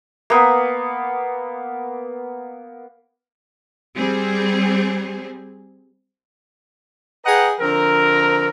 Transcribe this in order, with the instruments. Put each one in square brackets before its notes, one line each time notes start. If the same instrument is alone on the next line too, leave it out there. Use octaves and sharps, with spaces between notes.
[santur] A#3 B3
[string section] G3 C4 G#4
[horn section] G#4 B4 D#5 F#5 G5 A#5
D3 F3 C4 A#4